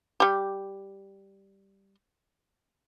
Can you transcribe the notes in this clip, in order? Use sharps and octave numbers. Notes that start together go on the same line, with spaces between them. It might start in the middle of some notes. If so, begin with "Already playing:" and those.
G3 G4